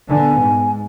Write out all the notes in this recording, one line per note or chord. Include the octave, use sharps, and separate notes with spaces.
D3 B3 G#5
G#2